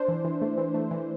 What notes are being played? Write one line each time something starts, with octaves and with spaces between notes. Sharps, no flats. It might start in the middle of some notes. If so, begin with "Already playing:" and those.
Already playing: D4 C5
E3
E3
A3
E3
A3
E3